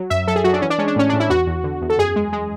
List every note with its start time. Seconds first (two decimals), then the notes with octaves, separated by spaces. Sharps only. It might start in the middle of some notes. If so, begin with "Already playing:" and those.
Already playing: F#3
0.10 F#2 E5
0.28 F#3 A4
0.36 G#4
0.44 F#3 F#4
0.53 D4
0.62 E3 C#4
0.70 D4
0.78 G#3 C#4
0.88 D4
0.96 A2 C#4
1.09 A2 D4
1.20 E4
1.30 E2 F#4
1.47 E2
1.64 D3
1.82 E2
1.90 A4
1.98 F#2 G#4
2.16 G#3
2.33 G#3